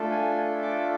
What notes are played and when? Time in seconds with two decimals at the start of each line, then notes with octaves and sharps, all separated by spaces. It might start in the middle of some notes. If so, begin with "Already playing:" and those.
Already playing: A3 D4 F4 A4
0.11 G#5
0.62 D6